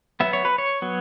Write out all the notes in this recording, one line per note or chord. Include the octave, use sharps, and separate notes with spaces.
F#3 B3 E5
C#5
B4
C#5
F#3 B3